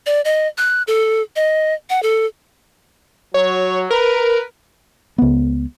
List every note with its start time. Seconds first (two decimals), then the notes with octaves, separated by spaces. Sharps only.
0.06 D5
0.25 D#5
0.58 F#6
0.87 A4
1.36 D#5
1.90 F#5
2.03 A4
3.34 F#3 C#5
3.90 A#4 B4
5.18 C#2 B3